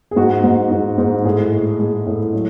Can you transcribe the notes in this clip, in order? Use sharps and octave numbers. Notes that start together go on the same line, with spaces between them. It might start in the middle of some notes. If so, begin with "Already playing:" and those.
G#4
G#2 F#4
G#2
G#2
G#2
A2 G#4
G#3
G#3
A2
F#3